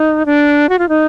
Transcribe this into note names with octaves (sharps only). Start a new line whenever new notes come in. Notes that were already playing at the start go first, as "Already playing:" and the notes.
Already playing: D#4
D4
F#4
F4
D#4